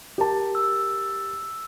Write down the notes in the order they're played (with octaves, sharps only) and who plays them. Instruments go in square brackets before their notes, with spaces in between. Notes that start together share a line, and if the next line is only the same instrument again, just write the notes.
[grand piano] G4 A#4 A5
[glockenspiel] E6